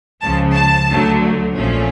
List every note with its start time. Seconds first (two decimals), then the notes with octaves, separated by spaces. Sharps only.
0.21 C#2 C#3 F3 A5
0.55 A5
0.88 D2 D3 F#3 A3
1.54 A#1 A#2 F3 A3 C#4